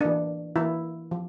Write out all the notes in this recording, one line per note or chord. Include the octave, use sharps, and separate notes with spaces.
E3 A#3 D4
E3 A#3 E4
F3